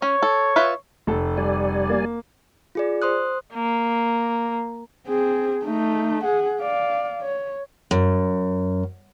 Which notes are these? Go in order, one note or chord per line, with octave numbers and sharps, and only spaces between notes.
C#4 C#5
A4
F4 B4 E5
F1 A4
G3 D5 G#5
A#3
F4 G#4 D5
C5 C6 D#6 F#6
A#3
C4 G#4
A3 D#4
G#4 F#5
D5 F5
C#5
F#2